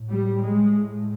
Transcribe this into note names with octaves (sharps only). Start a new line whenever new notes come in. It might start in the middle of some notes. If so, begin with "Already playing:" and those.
Already playing: A2
G3
G#3